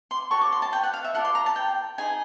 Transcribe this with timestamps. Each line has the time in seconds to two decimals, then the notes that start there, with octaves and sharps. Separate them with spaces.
0.11 C6
0.31 F#4 A4 C#5 C#6
0.41 D6
0.52 C6
0.62 A5
0.73 G5
0.83 F#5
0.93 F5
1.04 E5
1.15 F4 A4 D5 F#5
1.25 C6
1.35 A#5
1.46 A5
1.56 G5
1.98 D#4 G#4 C5 D#5 G#5